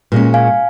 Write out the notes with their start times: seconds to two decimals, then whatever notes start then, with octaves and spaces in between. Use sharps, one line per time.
0.12 A#2 G#3 C#4
0.34 F5 G#5